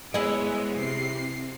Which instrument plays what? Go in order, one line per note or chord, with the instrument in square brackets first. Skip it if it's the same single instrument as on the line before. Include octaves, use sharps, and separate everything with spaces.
[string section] G#3 B3 C#5 [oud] E4 G#4 D#5
[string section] C3 C7